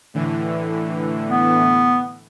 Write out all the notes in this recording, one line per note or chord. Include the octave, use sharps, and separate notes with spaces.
A2 D3 E3
B3